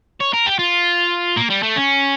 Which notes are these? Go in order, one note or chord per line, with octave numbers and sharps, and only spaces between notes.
C#5
A#4
G4
F4
A#3
G3
A3
C#4